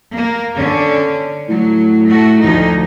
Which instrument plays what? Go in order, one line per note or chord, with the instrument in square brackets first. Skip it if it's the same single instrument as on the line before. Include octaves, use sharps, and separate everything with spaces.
[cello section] A#3
D3 C#4
[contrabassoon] A2 [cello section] F#3
[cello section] A3 F#4
D2 F3 D#4